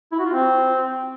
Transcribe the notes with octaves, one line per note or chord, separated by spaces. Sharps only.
E4
F#4
F4
C4